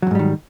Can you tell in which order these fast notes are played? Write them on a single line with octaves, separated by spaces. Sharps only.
F#3 F2 G#2 G3 D#3